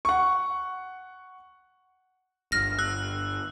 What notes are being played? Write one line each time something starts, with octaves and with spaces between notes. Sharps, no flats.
F#5 C#6
D1 G1 F6 A#6
E6 F#6